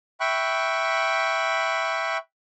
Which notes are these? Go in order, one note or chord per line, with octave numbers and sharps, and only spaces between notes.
E5 G5 B5 C#6 F#6